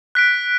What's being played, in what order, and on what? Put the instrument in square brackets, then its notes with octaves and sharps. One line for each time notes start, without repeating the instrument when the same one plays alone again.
[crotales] F#6 B6 D7